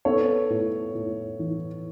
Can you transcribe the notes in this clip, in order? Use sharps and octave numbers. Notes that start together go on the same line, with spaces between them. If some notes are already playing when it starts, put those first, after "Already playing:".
B3 A4 C#5
A2
A2
E3